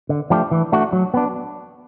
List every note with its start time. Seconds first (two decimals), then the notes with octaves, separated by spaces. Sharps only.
0.09 D3
0.30 F3 A3 D4 G4
0.51 E3
0.72 A3 D4 F#4
0.93 F#3
1.14 B3 D4